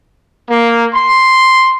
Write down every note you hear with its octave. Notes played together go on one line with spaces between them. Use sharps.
A#3
C6